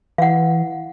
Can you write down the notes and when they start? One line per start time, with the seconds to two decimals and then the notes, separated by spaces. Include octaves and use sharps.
0.18 E3 F5 F#5